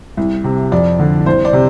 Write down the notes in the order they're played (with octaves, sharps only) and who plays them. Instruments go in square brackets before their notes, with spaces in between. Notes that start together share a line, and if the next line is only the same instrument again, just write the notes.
[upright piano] C2
C3
F2 D5
D3
C2 C5
D5
C3